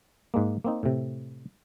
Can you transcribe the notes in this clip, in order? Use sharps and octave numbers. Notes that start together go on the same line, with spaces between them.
G#2 G#3 A#3
A#3 C4 D#4
A2 C3